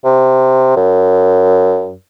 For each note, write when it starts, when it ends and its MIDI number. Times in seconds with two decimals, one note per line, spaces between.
0.05 0.74 48
0.76 1.94 42